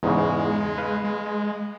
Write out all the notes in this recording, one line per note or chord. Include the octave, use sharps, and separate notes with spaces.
E2 G#2 C#3 G#3
B4 F5
G#3